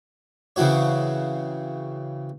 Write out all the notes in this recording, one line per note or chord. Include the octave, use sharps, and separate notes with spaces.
C#3 E3 C4 F#4 C#5